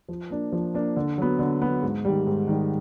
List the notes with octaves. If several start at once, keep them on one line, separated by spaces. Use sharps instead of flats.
F3
A#3 D4
F3
A#3 D4
D3
F#3 B3
D3
F#3 B3
G#2
D#3 G3
G#2
D#3 G3